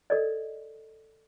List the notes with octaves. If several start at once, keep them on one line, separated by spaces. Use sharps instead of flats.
A4 A#4 D5 D#5